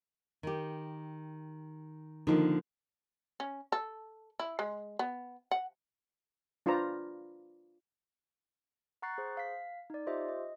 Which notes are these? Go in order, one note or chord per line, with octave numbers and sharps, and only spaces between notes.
D#3 G4
D3 D#3 F3 A#3 D#4
C#4
A4
E4
G#3
B3
F#5
D4 F4 B4 C5 D5 A#5
F#5 A#5 C#6 F#6 A6 C7
G#4 C5
F5 B6
D#4 D5
F4 G4 C5 D#5 E5
D#5